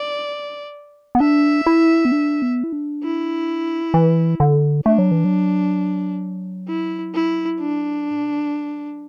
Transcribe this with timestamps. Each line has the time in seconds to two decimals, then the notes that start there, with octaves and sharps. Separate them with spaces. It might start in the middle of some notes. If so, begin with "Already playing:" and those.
Already playing: D5
1.15 B3
1.20 D4 E5
1.66 E4
2.05 B3
2.12 D4
2.42 B3
2.63 E4
2.72 D4
3.04 E4
3.94 E3
4.40 D3
4.86 A3 D4
4.98 F#3
5.11 E3
5.25 F#3
6.68 E4
7.15 E4
7.60 D4
8.11 A2
8.21 B2
8.31 D3
8.41 E3
8.51 F#3